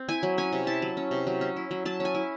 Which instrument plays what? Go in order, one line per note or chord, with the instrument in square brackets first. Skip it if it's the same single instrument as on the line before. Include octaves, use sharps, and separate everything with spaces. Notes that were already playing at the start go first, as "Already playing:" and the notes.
Already playing: [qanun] C4
E4 G#5
F#3
C#4 G#5
C3
E4 A5
F#3
C#4
C3
F#3
C#4
E4
F#3
F#3 A5
C#4 G#5
E4